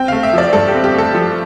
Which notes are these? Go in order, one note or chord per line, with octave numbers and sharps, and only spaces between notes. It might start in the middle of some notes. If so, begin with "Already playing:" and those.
Already playing: C4 G5
A3 F5
E5
F3 D5
G2 A4
G4
C4
G4
A3 A4
F3